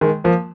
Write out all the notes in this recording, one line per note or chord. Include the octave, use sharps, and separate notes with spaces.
D#3 G#3
F3 A#3